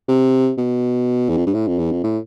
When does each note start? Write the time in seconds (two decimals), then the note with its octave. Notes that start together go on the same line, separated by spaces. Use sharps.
0.08 C3
0.58 B2
1.29 E2
1.37 F2
1.46 G2
1.54 A2
1.68 F2
1.78 E2
1.92 F2
2.04 A2